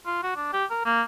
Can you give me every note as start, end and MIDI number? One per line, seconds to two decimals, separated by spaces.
0.06 0.22 65
0.23 0.36 66
0.36 0.50 62
0.53 0.65 67
0.70 0.82 70
0.85 1.02 58